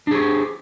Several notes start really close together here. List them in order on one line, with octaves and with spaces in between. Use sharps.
D4 G#4 G4